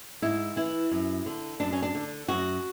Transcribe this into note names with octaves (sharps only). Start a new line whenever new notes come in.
G#2 E4
E3 E4
F#2
D3
F#2 D4
C#4
D4
D3
F#2 F#4